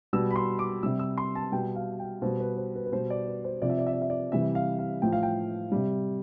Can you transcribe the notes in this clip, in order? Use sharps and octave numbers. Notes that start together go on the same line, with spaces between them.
B2 G3 E6
B5
C6
D6
C3 G3 E6
E6
C6
A5
B2 G3 G5
F5
G5
B2 G3 C5
B4
C5
B4
B4
B2 G3 C5
D5
B4
C5
C3 F3 D5
E5
D5
E5
D5
E5
D5
C3 E3 G3 E5
F5
F5
A2 F3 G5
F5
G5
C3 G3